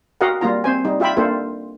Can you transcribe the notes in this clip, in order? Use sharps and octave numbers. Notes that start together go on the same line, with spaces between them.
F#4 G4 A#4 D#5 F5 F#5
G3 A#3 F4 A#5
C4 C5 G#5
G3 D#4
F4 G4 E5 G5 B5
A#3 D4 F4 A4 C5